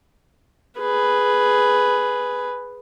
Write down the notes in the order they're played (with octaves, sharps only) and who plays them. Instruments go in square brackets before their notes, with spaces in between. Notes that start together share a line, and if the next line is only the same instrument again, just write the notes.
[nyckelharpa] G#4 B4